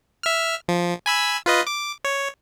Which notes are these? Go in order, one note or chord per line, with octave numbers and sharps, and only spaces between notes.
E5 F6
F3
G#5 B5 E6
F4 B4 D#5
D6
C#5